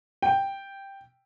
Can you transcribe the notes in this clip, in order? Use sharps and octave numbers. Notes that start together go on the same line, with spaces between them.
G5